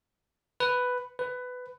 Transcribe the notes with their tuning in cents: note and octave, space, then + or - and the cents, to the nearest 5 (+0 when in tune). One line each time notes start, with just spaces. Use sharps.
B4 +5
B4 +15